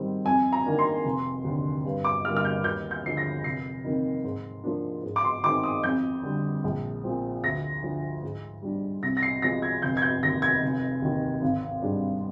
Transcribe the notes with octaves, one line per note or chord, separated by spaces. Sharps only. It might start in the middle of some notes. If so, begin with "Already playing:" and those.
Already playing: G#2 D#3 G3 C4
F2 G#5
A#5
D#3 A#3 D4
C6
F1
D#2 D3
G2
D6
D3 G3 A#3 F6
F6
G6
D#2 G6
G6
D3 F3 G#3 C7
A#6
F1 C7
F2 D#3 A#3 D#4
G#2
F3 A#3 D4
G#2
D6
C6
D#3 G#3 C4 D#4 D6
D#6
F2 G6
D3 G3
A#1
A#2 F3 C4
D2 A#6
D3 F3
G#2
G3 D4
C2 A#6
A#6
C7
C3 F3 G#3 A#6
G#6
F1 G6
G#6
G6
D#2 D#3 A#6
G#6
F1
D#2 D#3
G#1
G#2 G3 D4